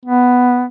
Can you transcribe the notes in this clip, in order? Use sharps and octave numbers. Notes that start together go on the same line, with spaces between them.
B3